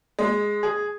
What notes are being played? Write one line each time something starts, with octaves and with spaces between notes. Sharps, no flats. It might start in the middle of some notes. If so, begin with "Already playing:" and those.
G#3
G#4